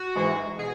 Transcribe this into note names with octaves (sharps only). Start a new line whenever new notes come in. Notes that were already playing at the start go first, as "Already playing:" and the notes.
Already playing: F#4
G#2 E3 G#3
B2 G#4